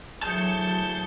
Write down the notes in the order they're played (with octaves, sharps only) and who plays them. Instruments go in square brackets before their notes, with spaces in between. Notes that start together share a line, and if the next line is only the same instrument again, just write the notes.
[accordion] D2 E3 G#4 [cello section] F#3 [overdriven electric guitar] A5 [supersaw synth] G6 C#7